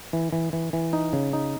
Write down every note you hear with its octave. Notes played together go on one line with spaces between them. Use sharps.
E3
E3
E3
E3
D#4
C#3
D#4